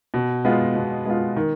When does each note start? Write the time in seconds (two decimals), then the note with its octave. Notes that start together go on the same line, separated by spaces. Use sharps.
0.14 B2
0.45 G#3 B3 F4
0.76 B2
1.05 G#3 B3 F4
1.36 D#3